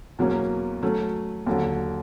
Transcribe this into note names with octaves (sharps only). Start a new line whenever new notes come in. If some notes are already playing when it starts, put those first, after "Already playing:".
E2 B2 F#3 A#3 C#4
F#3 A3 C#4
D#2 D3 F#3